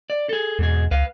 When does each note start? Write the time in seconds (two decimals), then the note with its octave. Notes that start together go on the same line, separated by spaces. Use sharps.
0.10 D5
0.29 G#4 A4
0.59 E2 G#2 B2 G#4
0.91 C#2 B4 F5